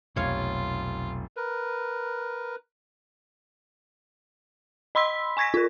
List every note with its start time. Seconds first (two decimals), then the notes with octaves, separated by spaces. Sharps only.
0.16 F1 B1 F4 C#5 F5
1.36 A#4 B4
4.95 D#5 B5 C6 E6 B6
5.37 G#5 C#6 G#6 A#6 B6
5.54 F4 A#4